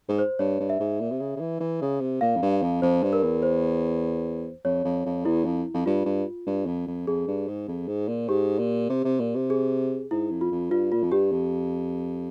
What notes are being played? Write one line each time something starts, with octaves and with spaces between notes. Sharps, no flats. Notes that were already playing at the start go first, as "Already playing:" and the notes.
G#2
C5
G2 C#5
G2
E5
G#2
A#2
C3
C#3
C#3
E3
E3
C#3
C3
A#2 F5
F2
G2
F2
F2 C5
G2
A#4
E2
C5
F2 C#5
F2
F2
E2 E4
F2
F2
G2 F4
G2
G2
F2
F2
F2 G#4
G2
G#2
F2
G#2
A#2
G#2 G4
A#2
C3
C3
A#2
C3
G#4
G#2 E4
F2
F4
F2
G2 F4
A#2 F4
F2
G2 G4
F2